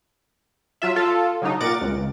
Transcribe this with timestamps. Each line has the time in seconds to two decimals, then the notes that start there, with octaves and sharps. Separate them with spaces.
0.82 F#3 F4 E5
0.96 F4 A4
1.42 C#3 F#3 D4 D#4
1.60 A#2 A#4 F#5 D6 A6
1.81 C#2